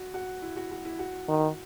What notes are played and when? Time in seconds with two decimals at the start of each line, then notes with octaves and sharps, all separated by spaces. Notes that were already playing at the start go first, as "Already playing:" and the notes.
Already playing: F#4
0.14 F#4
0.42 E4
0.56 F#4
0.71 F#4
0.85 E4
0.99 F#4
1.29 D#3